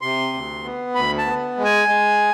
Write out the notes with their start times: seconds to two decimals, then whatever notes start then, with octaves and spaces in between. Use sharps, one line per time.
0.01 C3 C6
0.33 D2
0.64 B3
0.95 D2 B5
1.18 A5
1.26 B3
1.57 G#3
1.65 G#5
1.88 G#3